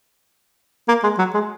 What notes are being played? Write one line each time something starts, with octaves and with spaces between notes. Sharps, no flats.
A#3
G#3
F#3
G#3